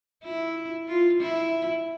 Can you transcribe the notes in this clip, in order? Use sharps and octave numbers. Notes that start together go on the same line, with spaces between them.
E4
F4
E4